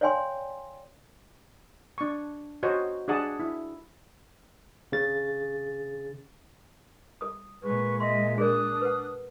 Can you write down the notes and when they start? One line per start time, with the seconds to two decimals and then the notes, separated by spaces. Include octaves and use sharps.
0.01 C#5 D5 F5 G5 G#5 C6
1.98 D4 C#6
2.63 F#4 C5 C#5 D#5
3.08 D4 G#4 F#5 A5 D#6
3.40 E4
4.92 C#3 A6
7.21 A4 D#6
7.63 A#2 G#3 B4 C#6
8.00 D#5 E5 C6
8.38 D4 G#4 A#4 D5 D#6 F#6
8.81 B4 F#5